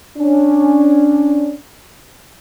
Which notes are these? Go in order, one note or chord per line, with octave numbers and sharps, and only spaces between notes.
C#4 D4